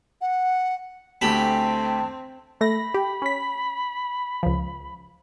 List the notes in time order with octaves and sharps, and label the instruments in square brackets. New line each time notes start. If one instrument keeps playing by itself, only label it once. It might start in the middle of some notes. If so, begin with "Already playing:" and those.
[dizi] F#5
[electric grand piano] D2 A3 E7 [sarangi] C4 [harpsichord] G4 B5 [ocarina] A5
[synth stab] A3 A#6 [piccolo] B5
[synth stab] G4
C#4 B6
C#2 F3